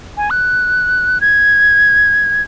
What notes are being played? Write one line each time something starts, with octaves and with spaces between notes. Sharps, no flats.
G#5
F#6
G#6